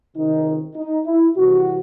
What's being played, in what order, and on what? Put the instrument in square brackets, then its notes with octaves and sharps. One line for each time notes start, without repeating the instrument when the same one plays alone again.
[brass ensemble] C#2 C3 D#3 D#4
D#4
E4
C2 C3 E3 F#4